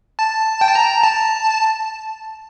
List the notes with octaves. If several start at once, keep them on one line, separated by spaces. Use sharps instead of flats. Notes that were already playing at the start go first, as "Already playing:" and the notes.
A5
G5
A5
A#5
A5